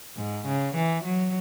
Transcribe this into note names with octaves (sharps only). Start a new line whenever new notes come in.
G#2
C#3
E3
F#3